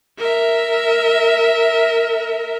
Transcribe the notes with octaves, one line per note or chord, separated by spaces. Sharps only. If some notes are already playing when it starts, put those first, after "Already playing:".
A#4 E5